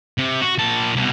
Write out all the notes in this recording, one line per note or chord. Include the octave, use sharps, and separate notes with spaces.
C3
F#4
A#2 A5
C2 B2